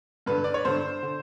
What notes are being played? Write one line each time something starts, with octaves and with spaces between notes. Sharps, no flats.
G2 D3 B4
D5
C#5
G2 D3 C5
D3